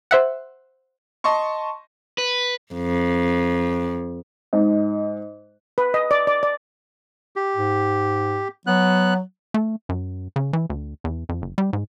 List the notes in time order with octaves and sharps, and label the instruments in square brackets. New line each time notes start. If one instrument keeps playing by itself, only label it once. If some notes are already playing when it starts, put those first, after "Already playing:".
[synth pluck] C5 E5 F#5
[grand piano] D#5 A5 C6 C#6
[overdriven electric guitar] B4
[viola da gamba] F2
[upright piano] G#2 D#5
[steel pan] B4
D#5
D5
D5
D5
[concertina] G4
[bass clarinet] G#2
[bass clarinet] F#3 [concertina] B3 F#6
[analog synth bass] A3
F#2
C#3
E3
D2
E2
F2
F#1
G3
G#2